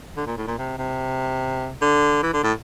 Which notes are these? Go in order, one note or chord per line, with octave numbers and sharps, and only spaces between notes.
D3
A#2
A2
A#2
C3
C3
D3
E3
D3
A2